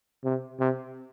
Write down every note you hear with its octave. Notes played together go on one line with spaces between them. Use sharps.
C3
C3